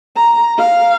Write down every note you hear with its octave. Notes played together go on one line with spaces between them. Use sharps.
A#5
F5